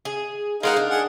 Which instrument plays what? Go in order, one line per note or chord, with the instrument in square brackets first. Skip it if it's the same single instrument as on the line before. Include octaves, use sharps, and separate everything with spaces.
[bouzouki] G#4
[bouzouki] G#3 A#4 F#5 [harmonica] D#4 F5
[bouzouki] D4
[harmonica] G#4 F#5